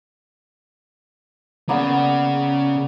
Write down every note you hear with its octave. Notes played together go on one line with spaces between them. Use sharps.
C#3 A#3 B3 D5